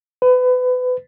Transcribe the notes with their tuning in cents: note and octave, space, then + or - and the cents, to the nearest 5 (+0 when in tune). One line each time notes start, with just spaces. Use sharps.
B4 +30